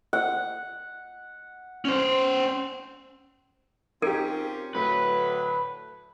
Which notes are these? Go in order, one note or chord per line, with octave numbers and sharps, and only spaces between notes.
F#5
C#4 C5
C4 C#4 D#4 F4 G4 A#4
A2 D3 F#3 A3 B4